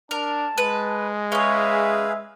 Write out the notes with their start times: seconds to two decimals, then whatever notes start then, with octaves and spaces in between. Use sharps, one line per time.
0.11 D4 A#4 A5
0.58 G#3 B4
1.32 C#4 G#4 B4 C#5 E5 F5